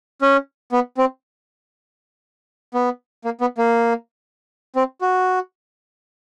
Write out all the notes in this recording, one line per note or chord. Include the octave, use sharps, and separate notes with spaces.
C#4
B3
C4
B3
A#3
B3
A#3
C4
F#4